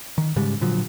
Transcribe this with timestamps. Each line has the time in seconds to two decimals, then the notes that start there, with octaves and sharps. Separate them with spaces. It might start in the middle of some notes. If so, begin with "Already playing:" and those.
0.18 D#3
0.36 G#2 C#3 G3 G#3
0.61 A#2 D3 F3 F#3